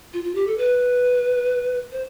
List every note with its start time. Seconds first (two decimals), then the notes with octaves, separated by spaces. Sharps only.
0.13 F4
0.24 F4
0.35 G4
0.47 A4
0.58 B4
1.92 C5